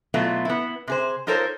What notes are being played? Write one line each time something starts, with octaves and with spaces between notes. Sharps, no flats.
B2 F#3 A3 B3 E4 F4
B3 E4
C3 G#4 C5
D#4 F4 A4 A#4 C5 C#5